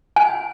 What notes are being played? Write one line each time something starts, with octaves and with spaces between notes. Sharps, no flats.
G#5